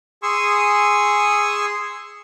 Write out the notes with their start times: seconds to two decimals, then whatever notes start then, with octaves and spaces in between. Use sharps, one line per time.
0.23 G#4 G#5 C6 C#6 D#6 E6